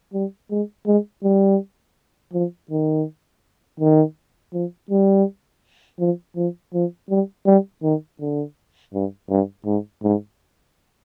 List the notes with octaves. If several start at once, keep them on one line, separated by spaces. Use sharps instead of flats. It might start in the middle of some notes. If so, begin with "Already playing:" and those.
G3
G#3
G#3
G3
F3
D#3
D#3
F3
G3
F3
F3
F3
G3
G3
D#3
D3
G2
G2
G#2
G#2